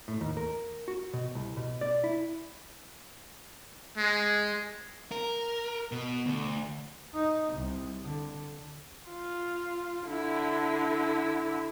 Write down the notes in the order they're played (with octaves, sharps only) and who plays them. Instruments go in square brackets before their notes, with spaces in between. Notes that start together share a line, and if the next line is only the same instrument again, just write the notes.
[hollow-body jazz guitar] A2
D#2
A#4
F#4
B2
C2
B2
D5
E4
[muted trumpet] G#3
[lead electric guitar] A#4
B2
D2
[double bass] D#4
C2
D3
[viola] F4
D3 E4